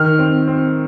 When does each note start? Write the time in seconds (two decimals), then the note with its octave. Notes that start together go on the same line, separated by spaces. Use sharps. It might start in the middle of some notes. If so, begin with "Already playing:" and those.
Already playing: D#3 F6
0.19 C4
0.48 C4